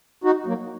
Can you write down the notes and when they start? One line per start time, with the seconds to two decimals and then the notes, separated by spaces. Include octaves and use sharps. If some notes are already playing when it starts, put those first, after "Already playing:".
0.24 D#4 F#4
0.46 F#3 A#3